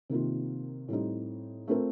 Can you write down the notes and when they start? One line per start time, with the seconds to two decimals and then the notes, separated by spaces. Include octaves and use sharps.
0.10 C3 D#3 A#3 F4
0.88 A2 G3 C4 D#4
1.68 A3 C4 F4 A#4